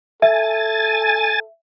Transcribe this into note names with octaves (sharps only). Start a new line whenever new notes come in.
A4 E5 G#5 A6